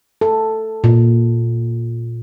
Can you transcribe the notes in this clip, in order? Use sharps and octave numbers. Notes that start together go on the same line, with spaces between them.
A4
A#2